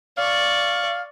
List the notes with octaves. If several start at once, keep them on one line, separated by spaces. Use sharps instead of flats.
D5 F5 C#6